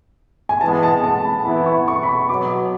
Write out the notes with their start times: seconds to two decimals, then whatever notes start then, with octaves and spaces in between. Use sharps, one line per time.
0.49 G#5
0.61 E3 G#3 B3 A5
0.83 A5
1.04 A5
1.24 B5
1.45 E3 B3 E4 B5
1.66 C#6
1.88 C#6
2.03 B5
2.09 C#6
2.29 B2 F#3 B3 D6